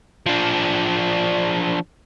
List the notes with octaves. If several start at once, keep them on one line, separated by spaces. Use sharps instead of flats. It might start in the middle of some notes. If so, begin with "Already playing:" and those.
F3 D4